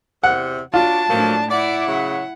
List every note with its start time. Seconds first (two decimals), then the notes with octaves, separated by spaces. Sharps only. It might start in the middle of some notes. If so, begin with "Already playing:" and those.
0.24 E2 C3 F#5
0.74 F#3 D4 F4 A5
1.09 A2 F3 F#3 A#3 D4
1.51 E4 D5 F#5
1.87 C#3 F#3